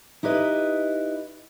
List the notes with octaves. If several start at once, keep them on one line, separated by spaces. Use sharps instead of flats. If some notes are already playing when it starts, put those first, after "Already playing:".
D#4 E4 G4 B4 D#5